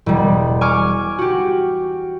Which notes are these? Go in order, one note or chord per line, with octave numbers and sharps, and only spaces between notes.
E1 G3
G#5 C#6 D6 F6
F#4 G4